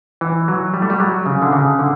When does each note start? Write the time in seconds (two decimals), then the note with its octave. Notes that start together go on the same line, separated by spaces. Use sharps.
0.21 E3
0.48 F#3
0.74 G3
0.82 A3
0.90 G3
1.00 F#3
1.26 C#3
1.42 D3
1.53 C#3
1.79 D3